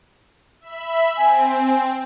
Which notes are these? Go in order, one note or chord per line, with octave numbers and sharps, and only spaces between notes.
E5 B5
C4 G#5